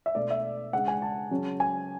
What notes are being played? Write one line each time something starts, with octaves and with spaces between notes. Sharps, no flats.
E5
B2 A3 D4 D5
E5
C#3 G#3 D4 F#5
G#5
A5
C#3 F#3 C#4
G#5